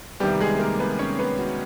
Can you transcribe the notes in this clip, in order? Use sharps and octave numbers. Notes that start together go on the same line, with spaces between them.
C2 C3 D#3 G3 B3 G4
G#3 G#4
A#3 A#4
B3 B4
C#4 C#5
B3 B4
F#4